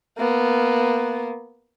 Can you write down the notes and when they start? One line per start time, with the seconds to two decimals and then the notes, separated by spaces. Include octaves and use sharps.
0.17 A#3 B3